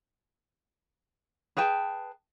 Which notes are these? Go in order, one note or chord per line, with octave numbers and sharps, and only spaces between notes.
G#4 B4 G5 A5